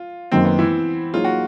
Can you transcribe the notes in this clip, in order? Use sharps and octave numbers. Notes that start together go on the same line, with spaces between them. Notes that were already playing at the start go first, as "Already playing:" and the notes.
Already playing: F4
F#2 D#3 F#3 A#3 C4
B3
E3 E4
F#3 A#3 D#4 F4 G#4 C#5
F#4